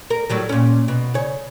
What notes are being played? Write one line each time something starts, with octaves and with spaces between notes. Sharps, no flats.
A#4
A2 F#3 G3
A#2 C#4
B2
C#3 C#5